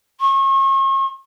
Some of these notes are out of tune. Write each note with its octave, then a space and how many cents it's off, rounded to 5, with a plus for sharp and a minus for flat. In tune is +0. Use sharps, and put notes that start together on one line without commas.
C#6 -40